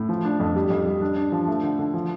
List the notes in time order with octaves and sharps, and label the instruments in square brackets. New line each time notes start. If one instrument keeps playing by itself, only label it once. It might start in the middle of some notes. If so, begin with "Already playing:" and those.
Already playing: [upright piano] A2
F3
D4
F2
G3
F2
G3
D4
D4
F3
A3
D3
D3
F3